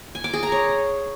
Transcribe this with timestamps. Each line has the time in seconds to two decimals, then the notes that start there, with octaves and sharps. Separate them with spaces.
0.15 G#5
0.24 D6
0.33 G#4
0.43 A#5
0.52 C#5